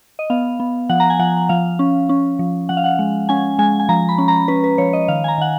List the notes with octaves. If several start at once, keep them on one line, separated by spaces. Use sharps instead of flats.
D#5
B3 F5
B3
F3 F#5
A#5
G#5
F3 F#5
F3 F5
C#4
C#4
F3
F3 F#5
F5
F#5
G#3
C#4 G#5
G#3 G#5
G#5
F3 A#5
B5
C#4
A#5
C#4 B4
B4
F3 C#5
D#5
D#3 F5
G#5
A#5
D#3 F#5